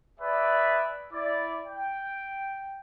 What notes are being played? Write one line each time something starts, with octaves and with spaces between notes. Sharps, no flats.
G#4 B4 D5 E5
E4 D5
G5